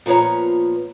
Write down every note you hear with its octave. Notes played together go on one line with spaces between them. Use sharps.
A#2 F3 B3 C#5 A#5